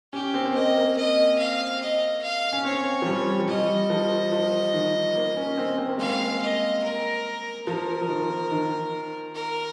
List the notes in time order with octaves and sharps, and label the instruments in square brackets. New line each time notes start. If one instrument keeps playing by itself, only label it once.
[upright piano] C#4 [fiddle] G4
[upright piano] C4
C4
[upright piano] A#3 [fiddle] D#5
[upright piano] A#3
[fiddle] D#5
F5
D#5
F5
[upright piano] C#4
[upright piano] C4 [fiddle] C#5
[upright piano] F3
G3
F3
[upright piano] G3 [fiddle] D#5
[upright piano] F3
F3
D#3
A#3
C#4
C4
C4
A#3
[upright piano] G#3 [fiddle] F5
[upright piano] A#3
[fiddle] D#5
A#4
[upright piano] F3 [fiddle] A#4
[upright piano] F3
D#3
D#3
[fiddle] A#4